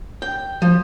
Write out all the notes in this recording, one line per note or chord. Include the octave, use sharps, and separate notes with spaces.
G5
F3